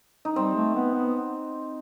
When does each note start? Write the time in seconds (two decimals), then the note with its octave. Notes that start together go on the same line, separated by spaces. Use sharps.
0.25 D#4
0.36 G3 C4
0.56 A3
0.75 B3
0.94 B3